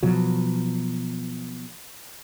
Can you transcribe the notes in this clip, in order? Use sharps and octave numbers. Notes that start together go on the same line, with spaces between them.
B2 F3 F#3